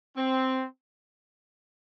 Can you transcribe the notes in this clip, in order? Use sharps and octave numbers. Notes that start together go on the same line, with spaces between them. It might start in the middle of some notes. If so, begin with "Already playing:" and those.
C4